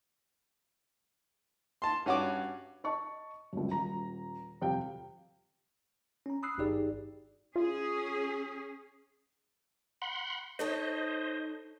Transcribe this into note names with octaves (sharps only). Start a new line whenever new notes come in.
A5 C6
G2 C#4 F#4 F#5 D6
D#5 A5 C#6
C#2 F#2
D#1 A#5
D#1 F2 C3 F5 G5
C#4 A#5
B5 D#6 E6 F#6 C7
G#1 G2 D#4 G4 G#4 D5
C#4 F4 G#4
F#5 B5 C6
D#4 A4 C5 C#5 D#5